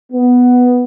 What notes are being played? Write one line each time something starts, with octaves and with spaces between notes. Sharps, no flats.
B3